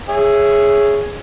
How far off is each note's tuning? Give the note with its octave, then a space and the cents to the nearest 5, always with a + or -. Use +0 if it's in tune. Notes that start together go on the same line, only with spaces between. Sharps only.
G#4 +0 C#5 +0 E5 +10